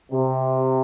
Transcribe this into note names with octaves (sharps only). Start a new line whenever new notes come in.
C3